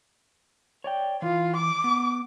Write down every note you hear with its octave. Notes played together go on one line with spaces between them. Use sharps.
C#5 D5 G5
E3 F4
D6
B3